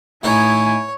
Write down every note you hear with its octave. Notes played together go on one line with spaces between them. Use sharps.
A2 D#4 E4 C#5 G#5